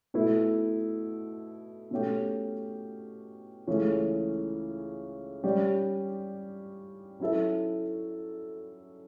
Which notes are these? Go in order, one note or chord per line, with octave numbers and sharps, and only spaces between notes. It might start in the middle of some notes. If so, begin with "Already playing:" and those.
B2 A3 E4 B4
B2 A3 C#4 G4
C#2 C#3 E3 A3 C#4
G3 C#4 G4 D5
F#3 C#4 E4 A4 E5